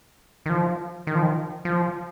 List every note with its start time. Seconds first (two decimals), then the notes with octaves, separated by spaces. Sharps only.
0.46 D#3
0.50 F3
1.07 D#3
1.15 F3
1.22 D#3
1.65 F3